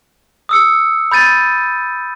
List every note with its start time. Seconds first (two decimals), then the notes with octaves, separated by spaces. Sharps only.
0.49 D#6 E6 C#7
1.11 B5 G6 A6 D#7